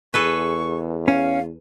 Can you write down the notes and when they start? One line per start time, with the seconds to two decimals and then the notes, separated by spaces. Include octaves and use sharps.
0.14 E2 G#4 A4 B4 C#6
1.08 C#4 F5